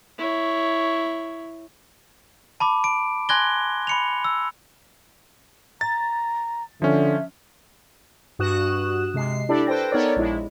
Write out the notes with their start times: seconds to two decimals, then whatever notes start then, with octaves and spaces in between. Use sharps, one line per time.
0.18 E4 C#5
2.60 A5 B5 D6
2.84 D7
3.29 G#5 C6 F#6 G#6 A#6 G7
3.87 B5 C#7 F7
4.24 E6
5.81 A#5 A6
6.82 D3 F3 C#4 E5
8.39 G2 F#4 D#6 F#6 E7
9.14 C3 G#3 C7
9.49 D4 E4 G4 A4 D5
9.67 A4 B4 C5 G5 A#6
9.92 B3 D#4 A4 A#4 C#5 D5
10.16 A#1 G#3 E4